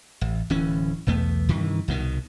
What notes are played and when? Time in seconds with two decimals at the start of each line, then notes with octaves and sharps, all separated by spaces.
0.21 A1
0.50 D1 E3 C#4
1.07 B1 E2 A3 B3
1.49 G2 C3 D#3 E3
1.88 C2 B2 D#3